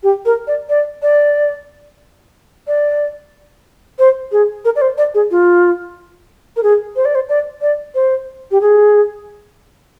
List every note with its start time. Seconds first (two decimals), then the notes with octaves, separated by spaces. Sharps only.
0.03 G4
0.26 A#4
0.47 D5
0.69 D5
1.02 D5
2.67 D5
3.99 C5
4.32 G#4
4.65 A#4
4.76 D5
4.82 C5
4.98 D5
5.14 G#4
5.31 F4
6.56 A#4
6.63 G#4
6.96 C5
7.05 D5
7.15 C5
7.29 D5
7.62 D5
7.95 C5
8.51 G4
8.61 G#4